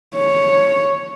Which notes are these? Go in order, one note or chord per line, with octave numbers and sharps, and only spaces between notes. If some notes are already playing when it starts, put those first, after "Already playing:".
C#5